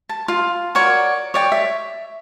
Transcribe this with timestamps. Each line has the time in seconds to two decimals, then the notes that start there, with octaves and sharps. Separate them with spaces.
0.09 A5
0.28 F4
0.75 F#4 A#4 C#5 D5
1.34 C#5 D5 G5
1.52 E5